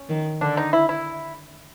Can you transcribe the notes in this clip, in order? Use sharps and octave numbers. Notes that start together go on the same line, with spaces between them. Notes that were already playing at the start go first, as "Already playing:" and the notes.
Already playing: C#4
D#3
D3 D4
D#4
E4
E4